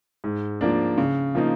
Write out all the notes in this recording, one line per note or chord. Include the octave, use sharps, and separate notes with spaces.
G#2
F3 A#3 D4
C#3
F3 A#3 D#4